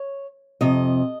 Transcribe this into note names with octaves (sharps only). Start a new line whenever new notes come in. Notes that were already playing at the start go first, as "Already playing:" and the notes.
Already playing: C#5
F2 C3 D#5